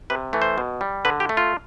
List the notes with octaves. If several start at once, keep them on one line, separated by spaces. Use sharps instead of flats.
C3 B4
E3 A3
C5
B2
G3
D3 B4
G4
A3
F4